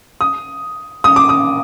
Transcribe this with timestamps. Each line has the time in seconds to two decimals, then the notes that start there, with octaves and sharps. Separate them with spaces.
0.21 D#6
1.04 D#6
1.16 D6
1.29 D#6